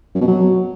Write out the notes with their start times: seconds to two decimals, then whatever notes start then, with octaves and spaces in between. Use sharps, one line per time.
0.15 F#2
0.21 B2
0.28 F#3